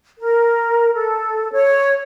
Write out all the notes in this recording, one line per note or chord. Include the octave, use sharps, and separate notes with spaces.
A#4
A4
C#5